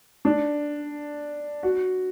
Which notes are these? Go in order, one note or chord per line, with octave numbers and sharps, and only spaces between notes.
D4
F#4